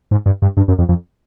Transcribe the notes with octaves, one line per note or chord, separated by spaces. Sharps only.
G#2
G2
G2
G2
F#2
F2
F2